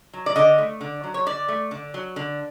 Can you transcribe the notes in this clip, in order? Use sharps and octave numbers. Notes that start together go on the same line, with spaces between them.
F#3
D5
D3 D#5
A3
D3
F#3
C#5
D3 D5
A3
D3
F#3
D3